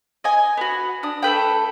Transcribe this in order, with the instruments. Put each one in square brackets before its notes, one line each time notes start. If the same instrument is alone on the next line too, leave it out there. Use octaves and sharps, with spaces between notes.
[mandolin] D#5 G#5
B3 F#4
D4 D#6
A3 A4 B4 G5